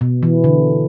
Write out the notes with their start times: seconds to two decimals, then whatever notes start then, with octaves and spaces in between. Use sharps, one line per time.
0.01 B2
0.23 E3
0.44 D3